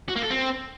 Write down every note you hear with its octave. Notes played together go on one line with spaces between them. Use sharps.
F#4
A#3
A4
C4